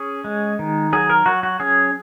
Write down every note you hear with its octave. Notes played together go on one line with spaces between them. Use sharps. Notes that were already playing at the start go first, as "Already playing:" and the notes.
Already playing: C#4 G#4
G#3
D#3
F#3 G#4
A#4
F#3 F#4
F#4
C#4 G#4